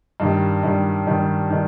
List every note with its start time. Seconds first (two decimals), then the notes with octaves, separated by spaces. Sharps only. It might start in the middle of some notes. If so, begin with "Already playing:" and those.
0.20 G2 D#3 G3
0.63 G2 D#3 G3
1.07 G2 D#3 G3
1.50 D#3 G3